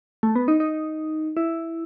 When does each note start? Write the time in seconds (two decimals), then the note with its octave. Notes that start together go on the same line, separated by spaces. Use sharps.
0.23 A3
0.36 B3
0.48 D#4
0.60 D#4
1.37 E4